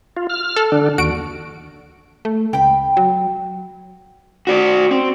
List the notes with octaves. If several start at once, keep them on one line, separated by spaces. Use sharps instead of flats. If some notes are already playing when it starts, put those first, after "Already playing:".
F4
F6
A4
D3 D4
D#2 F#4 D7
A3
C#2 G5 B5
F#3
F#4 D5
C4